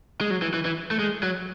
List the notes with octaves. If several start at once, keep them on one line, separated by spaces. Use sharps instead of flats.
G#3
F#3
E3
E3
E3
A3
G#3
F#3